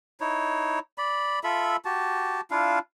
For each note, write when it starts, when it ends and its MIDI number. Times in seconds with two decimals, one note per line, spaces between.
0.21 0.79 63
0.21 0.79 64
0.21 0.79 73
0.98 1.39 74
0.98 1.39 83
1.44 1.76 65
1.44 1.76 69
1.44 1.76 76
1.44 1.76 83
1.85 2.41 66
1.85 2.41 67
1.85 2.41 81
2.51 2.79 62
2.51 2.79 64
2.51 2.79 65
2.51 2.79 77